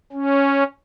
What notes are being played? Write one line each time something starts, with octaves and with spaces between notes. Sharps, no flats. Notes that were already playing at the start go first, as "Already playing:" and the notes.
C#4